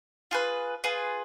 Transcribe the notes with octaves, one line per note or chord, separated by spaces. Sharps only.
F4 G#4 B4
F4 G#4 B4